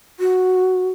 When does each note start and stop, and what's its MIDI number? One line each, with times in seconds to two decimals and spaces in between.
0.20 0.90 66